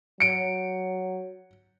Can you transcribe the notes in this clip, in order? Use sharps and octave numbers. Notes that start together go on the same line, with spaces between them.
F#3 C#7 D7